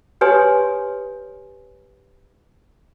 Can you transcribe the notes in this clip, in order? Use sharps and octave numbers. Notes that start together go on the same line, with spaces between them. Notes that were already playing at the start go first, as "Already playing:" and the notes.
G4 B4 C#5 G#5 C6 D#6